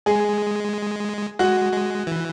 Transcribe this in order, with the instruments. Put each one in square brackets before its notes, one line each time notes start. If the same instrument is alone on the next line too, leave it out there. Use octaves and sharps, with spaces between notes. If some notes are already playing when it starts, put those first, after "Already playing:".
[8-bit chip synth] G#3 [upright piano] G#4
[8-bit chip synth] G#3 [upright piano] F#4
[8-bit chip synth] G#3
E3